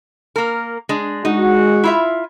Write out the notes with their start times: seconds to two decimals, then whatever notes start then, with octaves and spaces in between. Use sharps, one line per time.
0.36 A#3 A#4
0.89 G#3 D4
1.25 G#3 D#4 F#4
1.84 E4 F4 E5